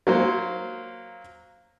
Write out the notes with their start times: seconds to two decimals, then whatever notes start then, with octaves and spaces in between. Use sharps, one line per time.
0.07 F#3 A#3 C5